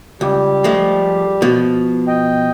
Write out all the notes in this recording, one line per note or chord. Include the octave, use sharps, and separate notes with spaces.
C#2 G3 G4
F3 G#3 A3
B2 F3
D#5 G5